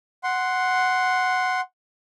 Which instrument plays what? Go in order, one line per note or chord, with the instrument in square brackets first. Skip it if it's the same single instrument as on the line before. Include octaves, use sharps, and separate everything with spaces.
[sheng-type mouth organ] F#5 C6